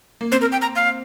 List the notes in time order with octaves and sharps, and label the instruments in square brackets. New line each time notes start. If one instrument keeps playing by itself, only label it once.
[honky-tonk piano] A#3
[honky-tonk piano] C4 [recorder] C5
[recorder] A#4
G5
A#5
F5